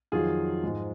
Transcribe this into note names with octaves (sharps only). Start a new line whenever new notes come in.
F2 D#3 F#3 F4 G#4
G#2 F3 G#3